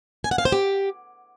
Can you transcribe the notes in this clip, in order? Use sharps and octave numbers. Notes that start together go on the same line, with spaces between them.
G#5
F#5
F5
C5
G4